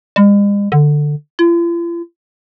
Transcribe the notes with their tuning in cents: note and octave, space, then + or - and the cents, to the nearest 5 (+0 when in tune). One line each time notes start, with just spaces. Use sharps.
G#3 -45
D3 +10
F4 -45